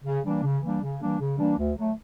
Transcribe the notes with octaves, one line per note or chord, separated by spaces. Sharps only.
C#3
E3 G3 A#3 D4
C#3
E3 G3 A#3 D4
C#3
E3 G3 A#3 D4
C#3
E3 G3 A#3 D4
D2
D3 F#3 A3